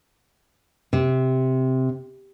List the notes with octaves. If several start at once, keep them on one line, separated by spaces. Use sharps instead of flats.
C3